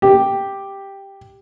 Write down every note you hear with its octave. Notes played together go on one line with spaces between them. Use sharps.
G4